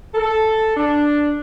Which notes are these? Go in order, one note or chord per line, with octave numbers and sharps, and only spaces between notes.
A4
D4